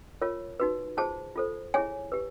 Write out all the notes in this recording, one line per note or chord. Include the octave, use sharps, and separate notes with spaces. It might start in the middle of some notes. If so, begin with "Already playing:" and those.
F4 A#4 C#5
D#4 F#4 B4
F4 G#4 C5 A5
F4 A4 C5
E4 G#4 C#5 G#5
G4 B4